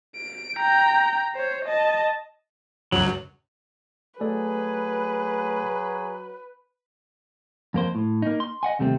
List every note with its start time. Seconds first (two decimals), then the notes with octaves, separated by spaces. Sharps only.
0.16 D7
0.58 G5 A#5
1.35 C5 C#5
1.65 D#5 A5
2.92 C#2 F#2 F#3
4.21 F#3 A3 G#4 A4 B4 D5
7.74 F2 A#3 C5
7.95 A2
8.22 A#3 D#4
8.40 C6
8.63 D#5 F#5 G#5
8.79 D#2 C3 G3 A3 C4